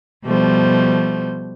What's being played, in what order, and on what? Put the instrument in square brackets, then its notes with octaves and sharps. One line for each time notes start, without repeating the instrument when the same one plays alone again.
[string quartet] B2 F3 G3 A3 C5